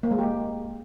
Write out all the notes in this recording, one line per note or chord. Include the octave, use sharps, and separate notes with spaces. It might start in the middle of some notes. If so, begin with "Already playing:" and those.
A#3
G#3
G4